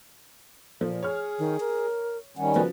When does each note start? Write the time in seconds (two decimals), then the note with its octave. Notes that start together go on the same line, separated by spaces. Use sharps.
0.81 A#2 F3
1.03 G#4 C#5 F6
1.39 D#3
1.60 A#4
2.37 D#3 G3 C#4 F#5
2.55 C#3 F3 F#4 B4